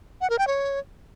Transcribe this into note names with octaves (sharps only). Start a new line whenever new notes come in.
F#5
A#4
G5
C#5